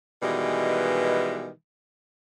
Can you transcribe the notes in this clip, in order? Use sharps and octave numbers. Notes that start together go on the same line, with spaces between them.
B2 D#3 E3 G3 G#3